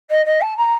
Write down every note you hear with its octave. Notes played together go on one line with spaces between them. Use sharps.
D#5
D#5
A5
A#5